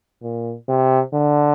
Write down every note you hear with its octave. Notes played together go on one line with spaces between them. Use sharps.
A#2
C3
D3